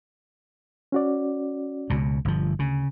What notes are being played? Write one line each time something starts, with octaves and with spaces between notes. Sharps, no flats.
C#4 F#4 D5
C#2 B2
G1 F3
D2 C#3